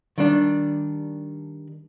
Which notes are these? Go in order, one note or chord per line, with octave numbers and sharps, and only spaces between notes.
D#3 G3 D4